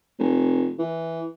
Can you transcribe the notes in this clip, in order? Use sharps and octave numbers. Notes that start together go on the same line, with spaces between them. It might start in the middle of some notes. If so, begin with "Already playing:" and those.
F1
E3